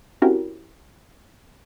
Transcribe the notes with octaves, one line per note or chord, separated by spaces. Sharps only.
C4 C#4 E4 F#4 G4 A#4